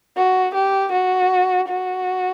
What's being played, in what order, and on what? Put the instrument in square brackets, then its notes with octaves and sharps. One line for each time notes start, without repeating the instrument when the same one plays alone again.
[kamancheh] F#4
G4
F#4
F#4